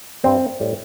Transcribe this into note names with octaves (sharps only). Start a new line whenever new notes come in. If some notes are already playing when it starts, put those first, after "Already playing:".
G2 G3 C4
A2 G3